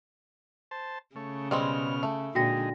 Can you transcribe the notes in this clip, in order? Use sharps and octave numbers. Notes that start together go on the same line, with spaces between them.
C5 A5
C#3 A3 C#5
B2 G3 G#3 C4 C#4 F6
A3
A#2 D3 G#3 D#4 F#4 G5 A#6